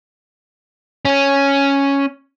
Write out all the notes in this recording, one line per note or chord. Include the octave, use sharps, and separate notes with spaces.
C#4